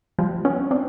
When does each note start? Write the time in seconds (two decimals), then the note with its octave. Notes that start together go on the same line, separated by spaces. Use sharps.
0.19 F3 G3
0.45 B3 C#4
0.71 C4 D4